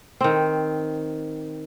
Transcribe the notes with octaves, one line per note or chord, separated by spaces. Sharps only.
D#3 C4